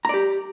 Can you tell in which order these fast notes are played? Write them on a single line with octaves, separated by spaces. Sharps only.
A#5 D5 G4